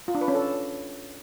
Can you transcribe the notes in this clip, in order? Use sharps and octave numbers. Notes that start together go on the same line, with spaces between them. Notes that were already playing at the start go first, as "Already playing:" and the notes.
F4
D4
B4
C#4
A4